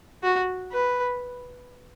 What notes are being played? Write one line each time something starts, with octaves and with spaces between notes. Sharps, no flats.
F#4
B4